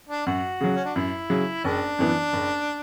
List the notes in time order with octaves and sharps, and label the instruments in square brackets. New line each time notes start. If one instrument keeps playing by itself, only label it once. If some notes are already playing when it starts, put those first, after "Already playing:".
[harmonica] D4
[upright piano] F#2 [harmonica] F#4
[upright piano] C#3 F#3
[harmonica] C#4
D4
[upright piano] F#2 [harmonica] E4
[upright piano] C#3 F#3
[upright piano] F#1 [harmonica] D4
[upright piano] F#2 E3 B3
F#1